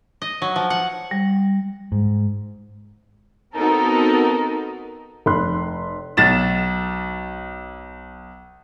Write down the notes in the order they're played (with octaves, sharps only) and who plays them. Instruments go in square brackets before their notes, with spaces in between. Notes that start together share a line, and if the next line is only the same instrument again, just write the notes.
[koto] D#5
F#3
F3
F#5
[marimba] G3
[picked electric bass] G#2
[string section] B3 C4 D#4 F#4 A4 A#4
[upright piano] F1 B5 C6 F#6
B1 A6 E7